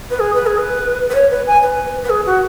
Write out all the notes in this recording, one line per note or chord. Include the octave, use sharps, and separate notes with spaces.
B4
G#4
B4
G#4
B4
B4
C#5
B4
G#5
B4
B4
G#4
F#4